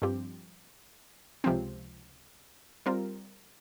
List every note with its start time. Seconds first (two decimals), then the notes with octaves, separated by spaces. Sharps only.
0.02 G2 F3 C4 G4
1.44 C#2 C3 F3 C4
2.86 G3 C4 F4 A#4